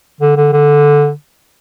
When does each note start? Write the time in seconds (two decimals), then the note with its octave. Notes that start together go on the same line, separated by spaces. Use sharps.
0.20 D3
0.37 D3
0.52 D3